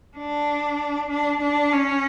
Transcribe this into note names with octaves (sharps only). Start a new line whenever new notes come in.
D4
D4
D4
C#4